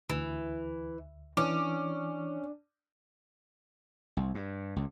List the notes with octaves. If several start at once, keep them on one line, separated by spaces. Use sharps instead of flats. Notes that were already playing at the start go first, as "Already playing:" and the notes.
D2 E3
E3 C#4 D4 D6
C2
G2
C#2